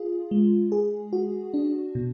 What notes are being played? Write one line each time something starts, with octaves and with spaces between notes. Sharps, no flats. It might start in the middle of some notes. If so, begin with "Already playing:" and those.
Already playing: F4 G#4
G#3
G#4
F#4
D4
B2